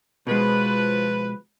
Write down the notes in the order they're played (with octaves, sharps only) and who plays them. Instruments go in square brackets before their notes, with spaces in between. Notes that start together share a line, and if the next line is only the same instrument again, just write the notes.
[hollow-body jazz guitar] B2 G#3 [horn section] F3 B4